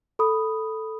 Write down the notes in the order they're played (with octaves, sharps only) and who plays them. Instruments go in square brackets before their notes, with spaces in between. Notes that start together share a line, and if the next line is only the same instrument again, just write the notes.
[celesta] A4 B5 D#6